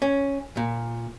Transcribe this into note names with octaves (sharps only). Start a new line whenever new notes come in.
C#4
A#2